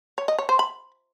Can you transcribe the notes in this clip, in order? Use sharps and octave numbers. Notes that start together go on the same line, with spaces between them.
C#5
D#5
C#5
C5
B5